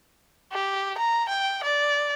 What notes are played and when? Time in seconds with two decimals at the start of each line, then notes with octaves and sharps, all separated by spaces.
0.52 G4
0.98 A#5
1.28 G5
1.63 D5